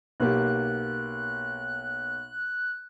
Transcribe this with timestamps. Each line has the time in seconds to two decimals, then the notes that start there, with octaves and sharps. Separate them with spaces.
0.20 B1 A#3 G4 F#6